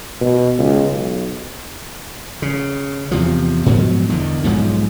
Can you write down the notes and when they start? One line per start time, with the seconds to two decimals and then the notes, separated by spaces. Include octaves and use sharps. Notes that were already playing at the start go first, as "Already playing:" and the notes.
0.21 B2
0.59 C#2
0.92 B1
2.42 C#3
3.11 E2 C3 F3
3.66 G#2 B2 F3 F#3
4.09 E2 D3 D#3
4.44 B1 G#2 F3 G#3